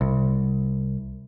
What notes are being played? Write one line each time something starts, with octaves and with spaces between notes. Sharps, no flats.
C2